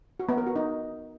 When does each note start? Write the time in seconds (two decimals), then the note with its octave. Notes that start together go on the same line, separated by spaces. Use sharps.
0.20 F#4
0.29 B3
0.38 A#4
0.47 F#4
0.56 D#4